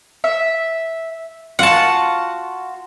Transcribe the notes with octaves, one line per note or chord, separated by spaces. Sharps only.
E5
F4 F#4 F#5 A5